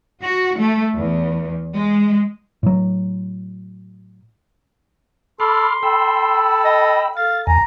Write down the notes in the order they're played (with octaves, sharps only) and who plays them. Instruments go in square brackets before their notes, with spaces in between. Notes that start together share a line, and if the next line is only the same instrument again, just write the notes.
[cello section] F#4
A3
E2
G#3
[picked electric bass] A2 F#3
[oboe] A4 [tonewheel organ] B5 D6 F6 [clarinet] C6
[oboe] A4 [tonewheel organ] G5 B5 E6
[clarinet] D#5
[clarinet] A4 [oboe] F5 [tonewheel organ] A6
[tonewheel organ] E2 G#5 [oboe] A#5